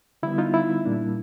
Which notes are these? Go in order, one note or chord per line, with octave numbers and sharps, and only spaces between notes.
D3 G3 B3 E4
D#4 F4
E4
A#2 G3 A#3 D4